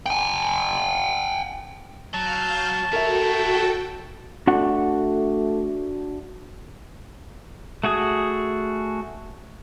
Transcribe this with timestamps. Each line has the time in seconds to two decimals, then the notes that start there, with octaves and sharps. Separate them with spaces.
0.06 G5 G#5
2.13 F#3 F5 A5 F6 G6
2.93 E4 F#4 A4 A#4 C#5 E5 G5
4.47 A3 D4 F#4 F#5
7.84 A3 F#4 G#4 D#6